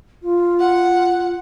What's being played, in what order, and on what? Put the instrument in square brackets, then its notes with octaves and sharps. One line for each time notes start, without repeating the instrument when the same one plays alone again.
[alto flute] F4
[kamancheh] F#5